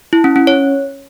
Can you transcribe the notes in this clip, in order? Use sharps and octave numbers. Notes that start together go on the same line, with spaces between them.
E4
C#4
C#4
C#5